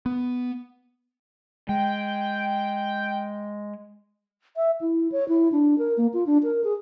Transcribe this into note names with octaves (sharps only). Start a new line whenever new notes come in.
B3
G#3 G5
E5
E4
C#5
E4
D4
A#4
A#3
F4
D4
A#4
G#4